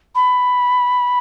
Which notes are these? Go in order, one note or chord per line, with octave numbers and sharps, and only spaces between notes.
B5